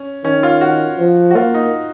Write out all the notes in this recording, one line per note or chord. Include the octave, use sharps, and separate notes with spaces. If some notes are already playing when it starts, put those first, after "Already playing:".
Already playing: C#4
D#3 C#4
F4
F#4
F3
F#4
A#3 F4
D#4